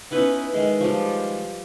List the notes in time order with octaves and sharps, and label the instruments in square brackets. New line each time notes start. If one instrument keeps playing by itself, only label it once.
[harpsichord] B3 C#4 [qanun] D#4 E4 B4
[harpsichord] D#3 G#3
[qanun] F3 G3